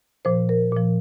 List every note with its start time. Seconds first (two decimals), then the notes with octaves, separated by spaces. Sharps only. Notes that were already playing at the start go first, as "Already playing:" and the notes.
0.25 A#2 F3 C5
0.49 A#4
0.72 A#2 F3